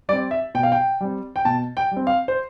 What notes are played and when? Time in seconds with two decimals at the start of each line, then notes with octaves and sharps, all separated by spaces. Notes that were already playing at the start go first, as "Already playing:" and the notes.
0.08 G3 D5
0.13 C4
0.31 E5
0.55 B2 G5
0.63 F5
0.72 G5
1.01 G3 C4
1.36 G5
1.45 B2 A5
1.77 G5
1.91 G3
1.97 C4
2.07 F5
2.28 C5